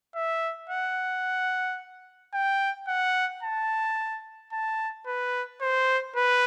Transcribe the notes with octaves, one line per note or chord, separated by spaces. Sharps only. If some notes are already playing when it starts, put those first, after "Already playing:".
E5
F#5
G5
F#5
A5
A5
B4
C5
B4